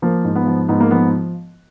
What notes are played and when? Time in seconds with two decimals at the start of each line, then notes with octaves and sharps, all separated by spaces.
0.02 F3 A#3
0.25 G#2
0.35 B3
0.47 F3
0.69 G#2 B3
0.80 A#3
0.91 F3 B3